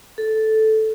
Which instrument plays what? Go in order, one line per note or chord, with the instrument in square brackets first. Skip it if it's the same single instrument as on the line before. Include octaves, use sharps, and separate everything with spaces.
[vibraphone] A4